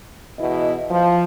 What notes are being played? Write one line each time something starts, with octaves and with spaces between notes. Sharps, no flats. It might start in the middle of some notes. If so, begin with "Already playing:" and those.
E2 B2 E4 D#5
F3